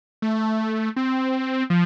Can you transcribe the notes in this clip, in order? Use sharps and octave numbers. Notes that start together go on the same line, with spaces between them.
A3
C4
F3